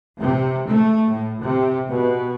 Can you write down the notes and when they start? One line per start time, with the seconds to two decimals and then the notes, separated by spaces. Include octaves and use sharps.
0.19 C3
0.69 A3
1.10 A2
1.41 C3
1.89 B2